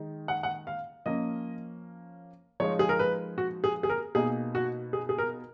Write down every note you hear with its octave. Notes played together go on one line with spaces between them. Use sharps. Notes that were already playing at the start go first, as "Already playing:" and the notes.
Already playing: D#3 G#3 D#4
F#5
F#5
F5
F3 A#3 C#4 D#5
F3 G#3 D#4 C#5
G#4
A#4
B4
F#4
G#4
G#4
A#4
B2 A#3 D#4 G#4
F#4
G#4
G#4
A#4